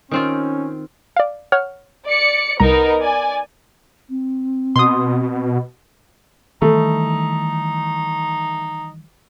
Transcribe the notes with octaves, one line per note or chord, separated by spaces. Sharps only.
D#3 C4 C#4 F4
D5 F5
C#5 F#5 F6
D5 C#7
C2 B3 D#4 A#4 A#5
D5 G#5
C4
B2 C6 D#6
D#3 E3 G3 A3 D#4